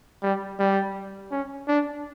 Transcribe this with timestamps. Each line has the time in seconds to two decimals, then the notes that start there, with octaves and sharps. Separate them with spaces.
0.23 G3
0.59 G3
1.31 C#4
1.68 D4